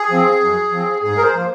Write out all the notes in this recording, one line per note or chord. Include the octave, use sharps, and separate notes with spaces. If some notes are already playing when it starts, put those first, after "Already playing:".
Already playing: G#4
F3 C4
F#2
F3 C4
G#2 G#4
A#4
C5
F3 A#3